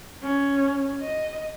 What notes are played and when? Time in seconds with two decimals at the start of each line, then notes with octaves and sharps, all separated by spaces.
0.23 C#4
1.02 D#5